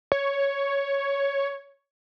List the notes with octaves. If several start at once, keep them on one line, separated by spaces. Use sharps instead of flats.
C#5